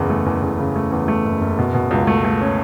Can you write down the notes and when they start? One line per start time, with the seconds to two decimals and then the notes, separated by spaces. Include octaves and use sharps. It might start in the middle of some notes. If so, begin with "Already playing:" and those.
Already playing: F#1 E2 C#3
0.10 A3
0.26 E2
0.42 E2
0.59 C#3
0.76 A3
0.92 E2
1.08 A3
1.25 F#1
1.41 F#1
1.59 B2
1.74 B2
1.91 C#2
2.07 A3
2.24 A3
2.41 C#4